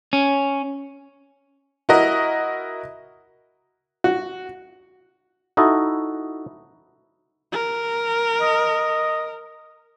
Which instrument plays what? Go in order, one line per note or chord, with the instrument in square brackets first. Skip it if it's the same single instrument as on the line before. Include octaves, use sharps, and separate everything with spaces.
[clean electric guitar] C#4
[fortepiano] E4 F#4 A#4 D#5
F#4
[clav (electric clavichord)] D#4 E4 F#4 A4 D#5
[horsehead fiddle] A#4
[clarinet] D#5